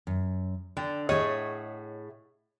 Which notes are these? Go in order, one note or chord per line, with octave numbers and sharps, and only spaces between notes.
F#2
D3 G5
A2 G#4 C#5 D#5 E5 F#5